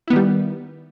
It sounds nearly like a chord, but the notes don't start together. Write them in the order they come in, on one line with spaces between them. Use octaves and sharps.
E4 B3 D#3 G3